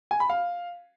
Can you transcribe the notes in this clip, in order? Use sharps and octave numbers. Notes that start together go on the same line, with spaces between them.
G#5
B5
F5